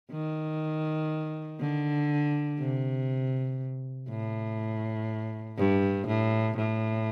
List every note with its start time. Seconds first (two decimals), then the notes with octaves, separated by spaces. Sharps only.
0.11 D#3
1.60 D3
2.59 C3
4.09 A2
5.58 G2
6.07 A2
6.57 A2